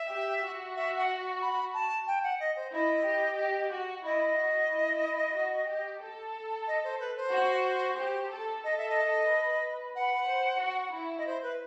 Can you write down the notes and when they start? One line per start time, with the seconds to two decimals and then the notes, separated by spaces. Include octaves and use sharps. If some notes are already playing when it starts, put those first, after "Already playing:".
Already playing: E5
0.10 G4
0.43 F#4
0.76 E5
0.97 F#5
1.42 B5
1.74 A5
2.07 G5
2.23 F#5
2.40 D#5
2.56 C5
2.73 E4 D#5
3.05 G4
3.38 G4
3.72 F#4
4.04 E4 D#5
4.38 F#4
4.71 E4
5.35 F#4
5.68 G4
6.01 A4
6.67 D#5
6.84 C5
7.00 B4
7.17 C5
7.32 F#4
7.98 G4
8.31 A4
8.64 A4 D#5
8.77 E5
8.89 D#5
9.30 B4
9.95 B4 F#5
10.28 C5
10.61 F#4
10.94 E4
11.18 D#5
11.27 C5
11.43 B4